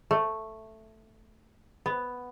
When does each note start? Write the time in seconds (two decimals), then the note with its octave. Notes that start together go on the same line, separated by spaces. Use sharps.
0.11 A3
1.86 B3